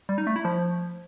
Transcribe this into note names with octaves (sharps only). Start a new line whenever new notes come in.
G3
D#4
A3
E4
F3